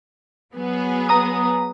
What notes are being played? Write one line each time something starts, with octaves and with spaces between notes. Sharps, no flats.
F#3 B3 G#4
A#5 D#6